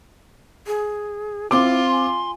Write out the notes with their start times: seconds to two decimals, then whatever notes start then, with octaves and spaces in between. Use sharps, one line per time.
0.67 G#4
1.51 C4 E4 F4 C6 D6
1.91 G#5